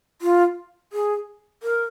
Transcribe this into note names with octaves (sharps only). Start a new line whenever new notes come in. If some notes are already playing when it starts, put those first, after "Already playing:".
F4
G#4
A#4